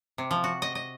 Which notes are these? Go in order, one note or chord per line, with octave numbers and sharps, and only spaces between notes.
C3
F3
F#4
D#5
D#5